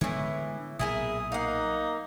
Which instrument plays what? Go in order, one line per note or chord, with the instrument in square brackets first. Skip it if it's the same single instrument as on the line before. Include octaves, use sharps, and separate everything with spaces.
[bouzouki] A2 E3 [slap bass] D3 G#3 B3
[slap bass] B1 A#2 [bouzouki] E4 G#4 A#4 [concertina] D#6
[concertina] A#3 [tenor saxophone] D#4 [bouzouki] F5 F#5